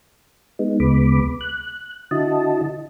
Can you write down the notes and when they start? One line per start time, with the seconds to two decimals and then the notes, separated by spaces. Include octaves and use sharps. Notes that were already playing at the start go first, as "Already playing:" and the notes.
0.59 G#3 B3 D#4
0.80 D2 C#3 G#3 B3 B5 D6
1.41 F#6
2.11 D3 E4 F#4 D#5 A5